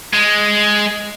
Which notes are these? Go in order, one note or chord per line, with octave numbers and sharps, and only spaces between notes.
G#3